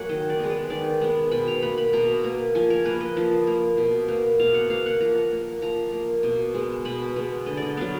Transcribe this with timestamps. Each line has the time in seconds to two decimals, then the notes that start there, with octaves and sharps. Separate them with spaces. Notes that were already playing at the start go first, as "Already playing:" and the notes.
Already playing: F#3 A#3 F#5 G#5
0.09 D#3 D#5
0.29 D5
0.39 G#3 B3
0.50 B4
0.70 D#3 D5
1.01 G#3 B3
1.31 B2 B5
1.48 A#5
1.62 A#3 B5
1.78 B5
1.93 B2 A#5
2.24 A#3
2.55 F3 G#5
2.70 A#4
2.85 A#3 B4
3.00 D#5
3.17 F3
3.47 A#3
3.77 B2
4.08 A#3
4.39 B2 F5
4.54 F#5
4.70 A#3 F5
4.86 F#5
5.00 F3 A#5
5.32 A#3
5.62 F3 A#5
5.92 A#3
6.23 B2
6.54 G#3 B3
6.85 B2 B5
7.16 G#3 B3
7.46 D3 D#5
7.57 D5 D#5
7.77 F#3 B3 F5